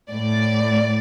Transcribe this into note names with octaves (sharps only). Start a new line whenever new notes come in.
A2 D5